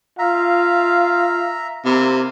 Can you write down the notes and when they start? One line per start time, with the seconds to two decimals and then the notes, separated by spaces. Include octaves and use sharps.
0.19 F4 E5 F5 A#5
1.85 C3 A#3 E4